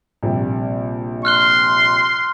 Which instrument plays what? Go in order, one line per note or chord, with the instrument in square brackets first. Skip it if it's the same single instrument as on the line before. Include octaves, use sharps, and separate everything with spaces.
[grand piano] A#1 C3 G3
[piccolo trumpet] C6 [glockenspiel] F6 F#6 G7